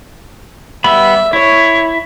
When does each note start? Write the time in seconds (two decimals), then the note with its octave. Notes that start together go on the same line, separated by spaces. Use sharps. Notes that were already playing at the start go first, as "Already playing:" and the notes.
0.84 G3 B3 E5 B5
1.33 E4 C#5 C#6